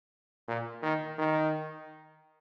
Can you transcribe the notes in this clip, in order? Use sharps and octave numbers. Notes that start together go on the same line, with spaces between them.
A#2
D#3
D#3